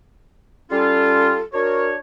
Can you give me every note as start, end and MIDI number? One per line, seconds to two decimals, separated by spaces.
0.71 1.38 55
0.71 1.38 61
0.71 1.38 65
0.71 1.43 69
1.54 1.95 62
1.54 1.95 66
1.54 1.88 70
1.54 1.95 73